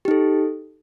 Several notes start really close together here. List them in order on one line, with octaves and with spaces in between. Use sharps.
G4 D#4 A4